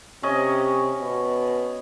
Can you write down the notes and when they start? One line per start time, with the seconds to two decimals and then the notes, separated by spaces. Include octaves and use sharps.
0.23 C3 C#4 D#5
1.00 B2